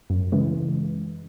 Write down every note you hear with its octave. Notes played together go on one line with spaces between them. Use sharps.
F#2
C#3 E3 G#3